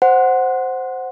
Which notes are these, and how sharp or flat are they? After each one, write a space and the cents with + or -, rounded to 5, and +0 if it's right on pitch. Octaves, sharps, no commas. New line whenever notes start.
C5 +0 F#5 +0